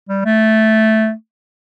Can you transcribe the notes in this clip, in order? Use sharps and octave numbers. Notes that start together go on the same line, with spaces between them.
G3
A3